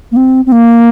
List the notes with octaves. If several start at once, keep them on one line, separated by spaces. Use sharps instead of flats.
A#3
C4
C4
A#3